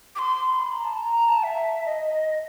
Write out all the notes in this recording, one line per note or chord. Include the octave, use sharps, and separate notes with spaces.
D6
C6
C6
B5
A#5
A5
A#5
A5
E5
D#5